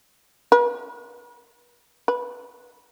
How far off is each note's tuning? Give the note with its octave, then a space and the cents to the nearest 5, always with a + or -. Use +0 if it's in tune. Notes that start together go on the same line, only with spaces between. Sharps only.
B4 -45
B4 -15